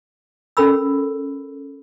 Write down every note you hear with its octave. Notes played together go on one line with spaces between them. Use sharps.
C#4 A4 A#4 B5 E6